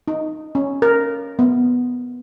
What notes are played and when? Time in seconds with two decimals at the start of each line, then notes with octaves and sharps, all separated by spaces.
0.08 D#4
0.55 C#4
0.82 A#4
1.39 B3